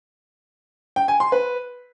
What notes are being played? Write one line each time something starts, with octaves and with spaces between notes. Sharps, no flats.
G5
G#5
C6
B4